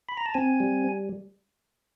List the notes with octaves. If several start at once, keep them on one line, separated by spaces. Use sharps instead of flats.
B5
A#5
A5
C4 G#5
G3